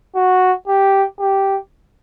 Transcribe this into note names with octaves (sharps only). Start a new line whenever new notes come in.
F#4
G4
G4